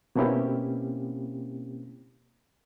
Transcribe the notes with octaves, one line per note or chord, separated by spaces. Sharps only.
B2 A#3 C4 C#4 E4 G4